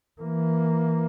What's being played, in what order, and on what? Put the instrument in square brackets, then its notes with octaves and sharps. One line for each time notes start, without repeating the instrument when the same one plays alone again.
[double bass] E3 A#3